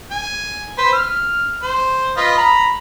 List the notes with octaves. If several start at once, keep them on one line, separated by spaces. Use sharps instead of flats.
G#5
B4 C5
F6
C5
F4 B4 D#5
A#5 B5